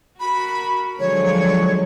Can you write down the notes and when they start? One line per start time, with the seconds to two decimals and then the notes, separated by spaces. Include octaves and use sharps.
0.20 F#4 A#4 B5
0.99 D3 F3 F#3 G#3 C#5